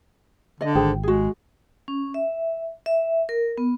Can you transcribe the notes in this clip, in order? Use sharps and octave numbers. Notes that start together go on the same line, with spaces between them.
D3 D5 D#5
G#1 G#4 C5 G5
G#3 F#4 G#4
C#4
E5
E5
A#4
B3